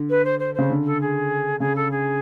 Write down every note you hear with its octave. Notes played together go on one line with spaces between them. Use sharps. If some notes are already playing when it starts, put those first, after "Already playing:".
Already playing: D3
B4
C5
C5
C#3 C5
D3
A4
G#4
C#3 G#4
A4
G#4